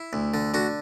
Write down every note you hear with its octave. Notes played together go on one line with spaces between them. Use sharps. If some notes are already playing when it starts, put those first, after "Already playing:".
Already playing: E4
D2
D3
D3 F#4